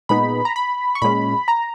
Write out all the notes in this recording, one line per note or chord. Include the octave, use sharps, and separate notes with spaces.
A#2 G#3 B3 D#4 B5
A#5
B5
C#6
A#2 G#3 C#4 B5
A#5